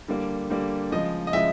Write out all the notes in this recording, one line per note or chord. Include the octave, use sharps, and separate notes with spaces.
D3 G3 A#3
D3 G3 A#3
C#3 F3 G#3 D#5
D#5
C#3 F3 G#3 E5